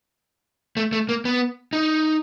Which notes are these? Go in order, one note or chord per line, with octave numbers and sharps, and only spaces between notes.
A3
A3
A#3
B3
D#4